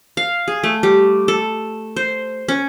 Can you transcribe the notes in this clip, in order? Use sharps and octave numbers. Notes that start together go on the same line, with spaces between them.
F5
G#4
A3
G3
A4
C5
C#4